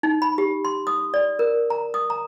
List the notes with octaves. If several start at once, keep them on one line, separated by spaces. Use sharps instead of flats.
D#4
B5
G4
C6
D#6
D5
A#4
A#5
D#6
A#5